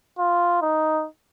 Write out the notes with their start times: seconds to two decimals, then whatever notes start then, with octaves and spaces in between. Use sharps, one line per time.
0.19 F4
0.62 D#4